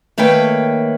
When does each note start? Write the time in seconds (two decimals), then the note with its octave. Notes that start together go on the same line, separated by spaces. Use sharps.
0.18 D#3 A3 A#3 B4 C#5 G5